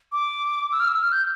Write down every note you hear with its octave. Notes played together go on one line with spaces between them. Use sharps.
D6
E6
F6
E6
F6
G6